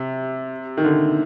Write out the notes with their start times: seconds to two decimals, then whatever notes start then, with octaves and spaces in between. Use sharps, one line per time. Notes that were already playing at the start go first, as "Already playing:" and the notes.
Already playing: C3
0.77 D#3
0.85 D3